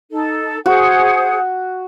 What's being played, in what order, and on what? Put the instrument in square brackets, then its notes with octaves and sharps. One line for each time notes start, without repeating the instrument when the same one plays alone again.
[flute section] D#4 A4
[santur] F#4 [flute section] G#4 C5 F#5